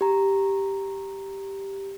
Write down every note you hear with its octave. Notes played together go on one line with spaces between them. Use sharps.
G4 A#5